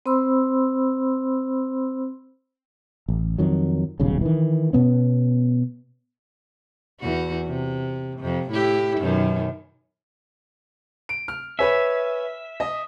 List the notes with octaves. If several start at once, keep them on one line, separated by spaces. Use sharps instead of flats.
C4 C5 B5 C6 E6
A1
F2 D#3 F#3
D#1 B1 C#3
D#3 E3
B2 B3 C#4
E2 F#4
C3
F2 C3
A2 E4 G4
F#2 B2 D#3
D7
F6
B4 C#5 E5 G#5
D#5